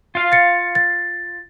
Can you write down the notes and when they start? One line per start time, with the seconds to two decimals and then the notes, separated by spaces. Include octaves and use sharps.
0.15 F4 F5
0.32 A6 C#7
0.75 A6